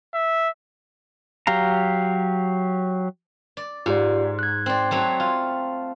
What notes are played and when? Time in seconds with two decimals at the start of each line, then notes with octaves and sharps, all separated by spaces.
0.14 E5
1.47 F#3 G4 F5 A#5
3.57 D5
3.86 G#2 F4 G4 D5
4.39 F#6 G#6
4.66 C4 D5
4.91 F#3 A3 C4
5.20 F4